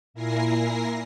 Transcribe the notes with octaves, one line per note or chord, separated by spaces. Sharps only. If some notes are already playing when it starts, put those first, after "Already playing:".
A#2 E4 A#4 G#5 A#6 C7